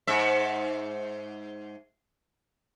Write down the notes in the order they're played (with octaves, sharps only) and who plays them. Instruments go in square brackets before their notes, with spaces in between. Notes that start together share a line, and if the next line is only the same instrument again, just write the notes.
[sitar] G#2 E5